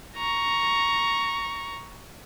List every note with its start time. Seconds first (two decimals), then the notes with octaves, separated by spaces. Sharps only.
0.17 A#5 C#6